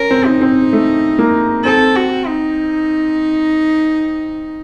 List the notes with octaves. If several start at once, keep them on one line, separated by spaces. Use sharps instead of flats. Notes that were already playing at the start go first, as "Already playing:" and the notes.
Already playing: C#4 A#4
C4
D#4
C4
A3
A#3
C4 A4
F#4
D#4